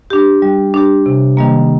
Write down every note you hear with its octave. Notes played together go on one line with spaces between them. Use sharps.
D4 G4
G3
D4 G4
C3
D#3 G3 A#3